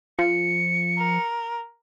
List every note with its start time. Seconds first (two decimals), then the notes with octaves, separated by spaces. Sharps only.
0.19 F3 C#7
0.98 A#4